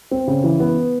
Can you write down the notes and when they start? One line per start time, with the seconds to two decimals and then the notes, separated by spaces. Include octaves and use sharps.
0.11 C4
0.27 C#3
0.44 E3
0.60 B3